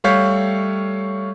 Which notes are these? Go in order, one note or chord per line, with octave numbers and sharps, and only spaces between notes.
G3 A3 C#5 F5 G6 B6